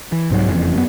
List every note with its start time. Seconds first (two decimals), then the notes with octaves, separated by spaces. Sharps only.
0.12 E3
0.30 C2 G#2 F3 F#3
0.49 F#1 F2 E3
0.74 F#2 E3 B3